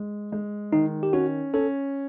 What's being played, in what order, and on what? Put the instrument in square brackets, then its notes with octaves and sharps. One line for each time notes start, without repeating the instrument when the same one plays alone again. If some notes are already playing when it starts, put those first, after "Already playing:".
Already playing: [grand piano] G#3
G#3
[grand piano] D#3 [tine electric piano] D#4
[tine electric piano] G4
[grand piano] C#4 [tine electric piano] F#4
[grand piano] C#4 [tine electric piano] A4